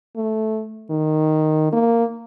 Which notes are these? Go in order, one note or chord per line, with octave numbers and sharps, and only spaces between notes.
A3
D#3
A#3